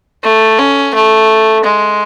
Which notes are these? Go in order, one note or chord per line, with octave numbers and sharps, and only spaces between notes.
A3
C#4
A3
G#3